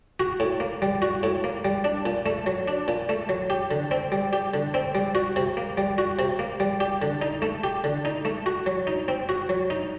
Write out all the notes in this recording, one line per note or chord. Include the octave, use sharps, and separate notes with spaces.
F#4
A2
A#3
G3
F#4
A2
A#3
G3
D4
A#2
A3
F#3
D4
A#2
A3
F#3
G4
D3
C4
G3
G4
D3
C4
G3
F#4
C3
A#3
G3
F#4
C3
A#3
G3
G4
D3
D#4
A3
G4
D3
D#4
A3
F#4
F#3
D#4
C4
F#4
F#3
D#4